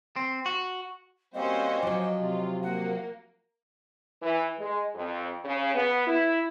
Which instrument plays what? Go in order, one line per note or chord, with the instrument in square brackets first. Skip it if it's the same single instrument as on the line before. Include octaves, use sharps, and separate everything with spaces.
[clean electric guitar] C4
F#4
[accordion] G3 A#3 C4 [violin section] C#4 F#4 C5 [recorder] D#5
[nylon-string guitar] F3 F#3 [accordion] D6
[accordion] C3 [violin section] F4
[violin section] A#3 [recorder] F#5
[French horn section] E3
G#3
F2
C#3
B3
E4